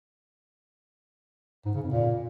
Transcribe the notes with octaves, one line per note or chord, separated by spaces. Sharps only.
G#2
C#3
F2
A#2